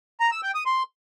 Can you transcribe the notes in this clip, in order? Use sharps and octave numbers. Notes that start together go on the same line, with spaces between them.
A#5
E6
G5
D#6
C6